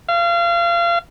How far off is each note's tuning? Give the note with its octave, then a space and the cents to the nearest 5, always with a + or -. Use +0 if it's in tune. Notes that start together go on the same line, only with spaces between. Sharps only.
F5 -30